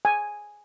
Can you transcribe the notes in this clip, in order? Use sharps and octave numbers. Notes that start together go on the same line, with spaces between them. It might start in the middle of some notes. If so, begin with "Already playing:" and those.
G#5